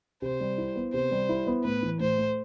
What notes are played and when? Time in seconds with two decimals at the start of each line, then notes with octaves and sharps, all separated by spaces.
0.22 C3 C5
0.40 G3
0.58 E4
0.76 B3
0.93 C3 C5
1.11 G3
1.29 E4
1.47 B3
1.64 A2 B4
1.82 E3
2.00 A2 C5
2.18 A3